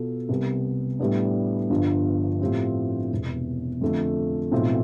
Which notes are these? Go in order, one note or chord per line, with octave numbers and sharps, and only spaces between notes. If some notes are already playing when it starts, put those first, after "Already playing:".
Already playing: B2 B3 F4 A4
C2 C3 G3 B3
A2 G3 B3 D4
G1 G2 F3
A2 F3 C4 G4
E1 E2 C3
F2 D3 F3 A3
B1 A2 F3 C4